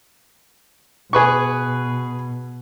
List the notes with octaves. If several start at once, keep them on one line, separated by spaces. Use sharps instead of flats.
B2 G#4 B4 C#6